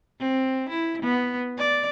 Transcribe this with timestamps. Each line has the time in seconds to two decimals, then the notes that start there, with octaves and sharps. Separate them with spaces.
0.20 C4
0.70 E4
1.02 B3
1.57 D5